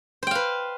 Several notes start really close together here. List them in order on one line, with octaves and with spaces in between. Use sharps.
C5 G5 F5 B4